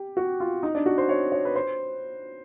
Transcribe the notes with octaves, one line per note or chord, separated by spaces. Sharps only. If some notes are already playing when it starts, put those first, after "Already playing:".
Already playing: G4
F#4
F4
D#4
D4
F#4
C5
C#5
C#5
B4
C5